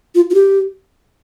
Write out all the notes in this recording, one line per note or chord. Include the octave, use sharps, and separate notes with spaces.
F4
F4
G4